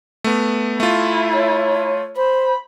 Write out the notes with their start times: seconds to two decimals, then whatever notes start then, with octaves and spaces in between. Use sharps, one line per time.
0.24 A3 B3
0.80 A3 E4 F4
1.34 C#5
2.17 C5 B5